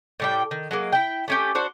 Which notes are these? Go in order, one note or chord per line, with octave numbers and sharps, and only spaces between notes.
A2 G3 G5
D#3
F#3 G#3 A#3
E4 G5
A3 C#4 G4
D4 F#4 C5